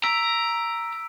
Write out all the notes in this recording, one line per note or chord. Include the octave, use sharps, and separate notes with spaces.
A#5 E6 B6 D7